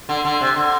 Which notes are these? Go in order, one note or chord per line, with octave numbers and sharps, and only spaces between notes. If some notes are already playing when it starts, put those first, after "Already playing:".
D3
D3
C3
D3